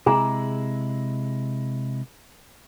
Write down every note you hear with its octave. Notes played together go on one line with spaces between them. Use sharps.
C3 G#3 E4 G#4 G#5 A#5